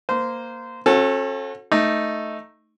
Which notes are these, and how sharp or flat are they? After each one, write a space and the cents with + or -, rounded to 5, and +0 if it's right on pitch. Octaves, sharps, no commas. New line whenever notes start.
A#3 +0 C5 -20
C#4 -45 F#4 -25 A4 +0
A3 +0 D#4 +0